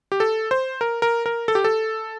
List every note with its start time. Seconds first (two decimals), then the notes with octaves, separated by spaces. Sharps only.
0.12 G4
0.20 A4
0.51 C5
0.81 A#4
1.02 A#4
1.26 A#4
1.48 A4
1.55 G4
1.64 A4